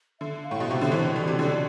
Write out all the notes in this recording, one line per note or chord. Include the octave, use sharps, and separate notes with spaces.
D3 E5
F5
A2
B2 F5
C3 E5
D3
E3 C5
E5
E3 D5
C3
D3 D5